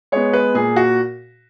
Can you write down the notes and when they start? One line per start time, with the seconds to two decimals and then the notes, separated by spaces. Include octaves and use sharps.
0.12 G#3 B3 C#5
0.33 B4
0.55 A#2 G#4
0.76 F#4